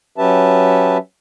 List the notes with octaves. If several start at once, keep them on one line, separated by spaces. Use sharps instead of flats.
F#3 C#4 G4 B4 E5 A5